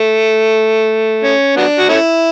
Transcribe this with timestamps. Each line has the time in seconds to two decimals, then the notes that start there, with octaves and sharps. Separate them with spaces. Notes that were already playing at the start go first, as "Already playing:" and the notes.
Already playing: A3
1.24 C#4
1.57 F#3 B3 D4
1.79 F#4
1.89 A3 C#4 E4